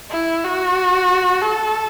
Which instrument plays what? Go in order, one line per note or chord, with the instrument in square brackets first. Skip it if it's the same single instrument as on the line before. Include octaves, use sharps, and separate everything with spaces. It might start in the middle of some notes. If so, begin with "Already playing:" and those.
[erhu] E4
F#4
A4